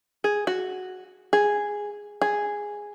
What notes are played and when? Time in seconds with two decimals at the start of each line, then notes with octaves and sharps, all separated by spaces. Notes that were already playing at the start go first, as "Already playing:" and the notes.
0.24 G#4
0.47 F#4
1.33 G#4
2.22 G#4